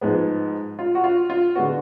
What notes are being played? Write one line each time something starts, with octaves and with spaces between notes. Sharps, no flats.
G#2 F3 G#3 B3
F4
F#4
F4
F4
D3 G#3 B3 F#4